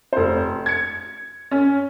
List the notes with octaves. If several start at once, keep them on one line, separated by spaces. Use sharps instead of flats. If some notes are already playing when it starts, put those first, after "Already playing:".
F1 C5
G#6 C#7
C#4